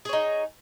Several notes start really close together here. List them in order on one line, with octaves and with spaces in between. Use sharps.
G#4 C#5 D#4